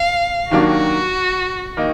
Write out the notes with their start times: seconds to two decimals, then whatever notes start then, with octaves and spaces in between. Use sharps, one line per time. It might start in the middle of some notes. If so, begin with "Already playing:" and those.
Already playing: F5
0.51 D#2 D#3 F#3 A#3 D4 F#4
1.77 D#3 A#3 D#4